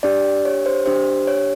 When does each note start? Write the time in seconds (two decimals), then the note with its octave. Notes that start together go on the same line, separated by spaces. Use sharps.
0.03 D4 G4 D5
0.45 C#5
0.66 C5
0.86 D4 G4 C5
1.27 C#5